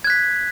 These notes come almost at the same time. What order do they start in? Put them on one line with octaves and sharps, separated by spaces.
G#6 F#6 B6